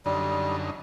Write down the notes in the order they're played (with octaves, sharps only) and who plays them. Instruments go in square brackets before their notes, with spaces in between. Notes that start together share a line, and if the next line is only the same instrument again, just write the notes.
[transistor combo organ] F#2 D3 D#4 [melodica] G3